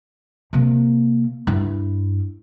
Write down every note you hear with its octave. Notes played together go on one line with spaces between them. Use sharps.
C3 A#3
G2 E4